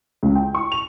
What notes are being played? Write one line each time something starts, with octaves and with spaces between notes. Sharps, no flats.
C#2
G5
C#6
F7